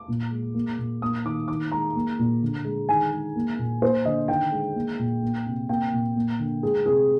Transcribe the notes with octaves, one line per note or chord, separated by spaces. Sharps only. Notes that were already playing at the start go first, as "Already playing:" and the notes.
Already playing: D6
A#2
G#3
A#3
A#2
A#3 D#6
D#3 D6
D#3 D6
G#3 A#5
A#3
A#2
D3
G#3
D#3 G#5
G#3
A#3
A#2
A#3 C5
D3 D#5
D#3 G5
G#3
A#3
A#2
A#3
C3
A#3 G5
A#2
A#3
D3
G#3 G#4
C3 G#4